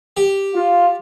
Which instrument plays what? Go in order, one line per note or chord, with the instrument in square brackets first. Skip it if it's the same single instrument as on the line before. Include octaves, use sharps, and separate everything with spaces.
[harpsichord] G4
[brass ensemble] F4